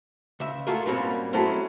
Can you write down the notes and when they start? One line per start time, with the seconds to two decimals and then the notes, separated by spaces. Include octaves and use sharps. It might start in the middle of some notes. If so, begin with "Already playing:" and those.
0.40 C#2 E5
0.67 A3 F4 F#4 G#4 A#4
0.85 G#2 B2 G3 A#3 C4 C#4
1.33 F#3 G#3 A3 C4 C#4 E4